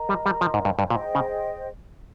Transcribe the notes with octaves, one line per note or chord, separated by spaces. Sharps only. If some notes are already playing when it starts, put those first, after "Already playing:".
Already playing: A#4 D#5 A#5
G3
G3
F3
G#2
G2
G2
A#2 G#4 C5 D#5 G5
C#3